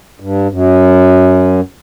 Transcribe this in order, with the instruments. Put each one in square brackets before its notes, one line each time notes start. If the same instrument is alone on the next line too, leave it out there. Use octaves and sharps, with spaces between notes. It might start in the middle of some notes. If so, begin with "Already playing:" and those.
[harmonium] G2
F#2